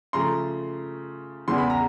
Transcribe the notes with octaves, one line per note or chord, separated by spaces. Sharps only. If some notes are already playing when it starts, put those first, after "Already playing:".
C#3 F3 A3 A#5 C6
E2 C#3 E3 C6
B5
A#5